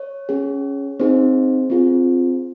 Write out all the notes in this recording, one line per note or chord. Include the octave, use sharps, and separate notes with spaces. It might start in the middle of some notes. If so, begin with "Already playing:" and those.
Already playing: C#5
C#4 G#4
C4 D#4 G#4 C5
C4 F4 G#4